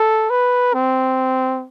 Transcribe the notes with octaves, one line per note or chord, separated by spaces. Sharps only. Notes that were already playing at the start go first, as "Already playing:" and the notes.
Already playing: A4
B4
C4